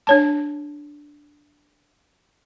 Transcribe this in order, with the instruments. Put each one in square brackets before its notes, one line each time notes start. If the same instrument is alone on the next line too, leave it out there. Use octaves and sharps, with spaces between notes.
[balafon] D4 C#5 A5